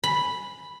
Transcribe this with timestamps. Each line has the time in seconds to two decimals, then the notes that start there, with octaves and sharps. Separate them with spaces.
0.04 B5